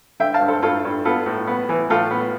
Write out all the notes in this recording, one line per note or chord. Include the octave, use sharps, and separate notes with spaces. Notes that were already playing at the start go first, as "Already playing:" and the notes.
D3 E5 G5
F5 A5
G2
A4 C5
G2 F4 A4
G2
B3 F4 A4
A2
B3
E3
A2 F4 A4
B3